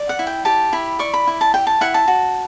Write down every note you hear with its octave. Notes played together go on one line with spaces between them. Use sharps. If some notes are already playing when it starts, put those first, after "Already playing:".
Already playing: D5
F#5
E4
G5
G4 A5
E4 B5
D5 C#6
B5
E4
A5
G4 G5
A5
E4 F#5
A5
F#4